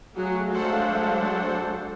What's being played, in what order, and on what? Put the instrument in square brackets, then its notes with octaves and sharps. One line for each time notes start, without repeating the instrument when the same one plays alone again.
[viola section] F#3 F#4 G#4 [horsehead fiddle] A3 F5
[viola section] F#3 G#3 D4 [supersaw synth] A4 C5 F#5